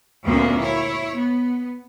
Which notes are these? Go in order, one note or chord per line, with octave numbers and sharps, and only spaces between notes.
D2 A#2 A#3 B3 C#4
E4 C#5
B3